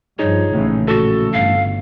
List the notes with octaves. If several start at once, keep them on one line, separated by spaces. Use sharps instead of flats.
G2 F3 D#4 G#4 C#5
A#1 A2 C#3 E3 C#4
F#4 A4
G1 F5